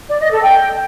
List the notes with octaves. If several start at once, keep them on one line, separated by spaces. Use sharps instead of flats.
D5
D#5
A4
G5